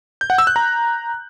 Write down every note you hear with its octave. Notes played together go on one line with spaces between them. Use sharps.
G6
F#5
E6
F#6
A#5